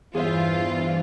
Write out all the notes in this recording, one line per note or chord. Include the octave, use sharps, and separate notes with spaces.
E2 G2 E3 F4 G#4 C5 E5